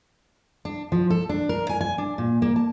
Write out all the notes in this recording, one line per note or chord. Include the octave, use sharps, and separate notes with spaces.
D4
F3
A4
D4
A#4
G#5
G#5
D4
A#2
A#3
A5